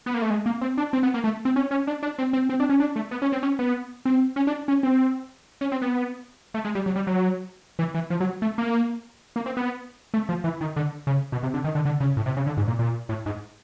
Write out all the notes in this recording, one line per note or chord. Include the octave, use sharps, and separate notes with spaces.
B3
A#3
A3
G#3
A#3
C4
D4
C4
B3
A#3
A3
C4
C#4
C#4
D4
D4
C4
C4
C4
D4
C#4
D4
A3
B3
C#4
C4
C#4
B3
C4
C#4
D4
C#4
C4
C#4
C4
B3
A3
G#3
G3
F#3
G3
F#3
E3
E3
F3
F#3
A3
A#3
A#3
C4
B3
A3
F3
E3
D#3
D3
C#3
B2
C3
D3
D#3
D3
D3
C#3
A2
C3
C#3
D3
G#2
A#2
A#2
A2
G#2